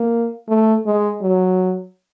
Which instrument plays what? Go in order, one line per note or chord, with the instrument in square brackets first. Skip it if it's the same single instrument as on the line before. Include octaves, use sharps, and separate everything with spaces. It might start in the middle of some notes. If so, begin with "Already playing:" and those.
Already playing: [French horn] A#3
A3
G#3
F#3